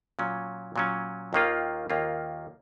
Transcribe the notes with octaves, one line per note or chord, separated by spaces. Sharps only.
A#2 F#3 C#4
A#2 F#3 C#4
D#2 D#3 A#3 F4
D#2 D#3 A#3 F4